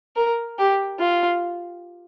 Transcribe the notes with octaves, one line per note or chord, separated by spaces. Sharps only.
A#4
G4
F4